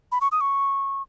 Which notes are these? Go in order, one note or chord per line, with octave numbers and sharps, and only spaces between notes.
B5
C#6
D#6
C#6